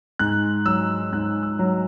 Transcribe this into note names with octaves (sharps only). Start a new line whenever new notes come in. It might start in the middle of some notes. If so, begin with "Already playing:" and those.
G#2 F#6
F#3 E6
G#2 F#6
E6
F#3